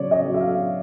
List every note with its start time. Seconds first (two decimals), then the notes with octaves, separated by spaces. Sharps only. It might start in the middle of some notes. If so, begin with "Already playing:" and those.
Already playing: C#3 F#3 C#5 D5
0.11 D#5
0.25 F#3
0.34 E5
0.41 F5